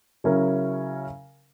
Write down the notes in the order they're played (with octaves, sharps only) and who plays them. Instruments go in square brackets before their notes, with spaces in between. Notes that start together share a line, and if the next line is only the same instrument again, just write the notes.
[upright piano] C#3 F#3 C#4 E4 A#4